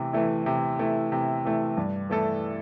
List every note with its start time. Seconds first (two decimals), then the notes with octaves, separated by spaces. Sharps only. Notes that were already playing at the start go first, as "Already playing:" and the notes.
Already playing: C3 E3 A3
0.13 E3 A3 E4
0.46 C3
0.79 E3 A3 E4
1.12 C3
1.45 E3 A3 E4
1.77 G2
2.10 E3 A3 E4 A4